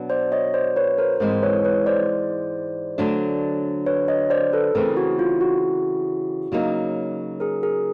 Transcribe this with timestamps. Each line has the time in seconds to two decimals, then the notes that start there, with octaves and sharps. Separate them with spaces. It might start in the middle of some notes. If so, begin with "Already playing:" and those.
Already playing: B2 F#3 B3 D4 F#4
0.10 C5 D5
0.32 C#5 D#5
0.53 C5 D5
0.76 B4 C#5
0.98 A#4 C5
1.20 G#2 E3 G#3 C4 A#4 C5
1.43 B4 C#5
1.64 B4 C#5
1.86 C5 D5
2.98 D3 F#3 A3 D4
3.86 B4 C#5
4.08 C#5 D#5
4.30 C5 D5
4.53 A4 B4
4.75 C#3 E3 A3 C4 G#4 A#4
4.97 F#4
5.19 F4
5.41 F#4
6.52 C#3 F#3 A#3 D#4
7.40 G#4 A#4
7.63 G#4 A#4